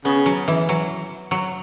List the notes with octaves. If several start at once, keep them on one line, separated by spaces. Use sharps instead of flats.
C#3 B3
F#3
E3
F#3
F#3